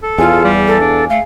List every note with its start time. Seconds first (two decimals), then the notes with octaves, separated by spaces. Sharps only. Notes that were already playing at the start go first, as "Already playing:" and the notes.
0.03 A4
0.18 E2 F4 G#4 E5 F5
0.44 G3
0.67 A4
0.80 D4
1.10 A3 F5